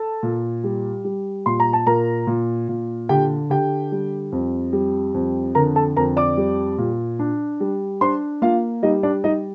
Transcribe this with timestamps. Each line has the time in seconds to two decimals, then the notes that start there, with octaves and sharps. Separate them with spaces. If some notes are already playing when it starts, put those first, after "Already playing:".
Already playing: A4 A5
0.23 A#2
0.64 G3
1.04 G3
1.46 A#2 C6
1.60 A#5
1.73 A5
1.86 A#2 A#4 A#5
2.27 A#2
2.69 A#2
3.09 D3 G4 G5
3.50 D3 G4 G5
3.92 G3
4.32 F2
4.73 G3
5.14 F2
5.55 D3 A#4 A#5
5.76 A4 A5
5.96 F2 A#4 A#5
6.17 D5 D6
6.37 G3
6.78 A#2
7.19 D4
7.60 G3
8.01 D4 C5 C6
8.42 A#3 F4 F5
8.83 G3 D#4 D#5
9.03 D4 D5
9.24 G3 D#4 D#5